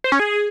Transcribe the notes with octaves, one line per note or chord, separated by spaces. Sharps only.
C5
C#4
G#4